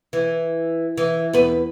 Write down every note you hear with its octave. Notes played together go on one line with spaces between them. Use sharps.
E3
E3
E2 B4